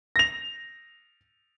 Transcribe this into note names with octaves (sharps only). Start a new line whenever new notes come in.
A#6 F7